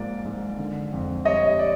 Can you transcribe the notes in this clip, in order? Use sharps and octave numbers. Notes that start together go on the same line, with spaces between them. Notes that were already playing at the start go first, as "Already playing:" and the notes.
Already playing: G#2 F3 A#3 D5
G#2
D3
F2
G3 C#5 D#5
D5